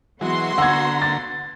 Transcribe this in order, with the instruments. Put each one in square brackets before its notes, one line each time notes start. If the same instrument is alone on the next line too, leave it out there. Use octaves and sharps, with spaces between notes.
[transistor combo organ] E3 F#3 G#3 [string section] B3 F#4 C6
[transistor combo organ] D3 A#5 [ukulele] F#5 [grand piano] E6 G#6
[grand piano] A6